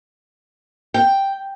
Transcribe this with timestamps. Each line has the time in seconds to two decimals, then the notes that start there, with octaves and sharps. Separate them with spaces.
0.94 G5